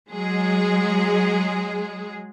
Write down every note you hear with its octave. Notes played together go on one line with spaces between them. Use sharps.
F#3 G#3 G#4